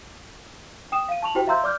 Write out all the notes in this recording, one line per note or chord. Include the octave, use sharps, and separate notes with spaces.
G5 D#6 E7
F5 D#7
A5 C#6 F7 F#7
E4 F#4 G4 C5 G5
E5 F5 A#5 C6 E6 G6
D5 D6 F6 G6